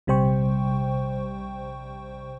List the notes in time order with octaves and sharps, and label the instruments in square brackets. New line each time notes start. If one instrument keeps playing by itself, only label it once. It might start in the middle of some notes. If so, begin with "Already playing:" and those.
[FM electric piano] A#1 C3 G3 C5 G5 C#6